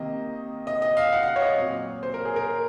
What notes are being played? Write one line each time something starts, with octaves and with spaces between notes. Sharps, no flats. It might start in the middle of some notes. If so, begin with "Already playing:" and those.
Already playing: C3 D#3 A#3 D#5
D#5
D#5
F5
F#5
F5
F#5
C#5
D#5
A#2 F#3 C4
C5
A#4
G#4
A#4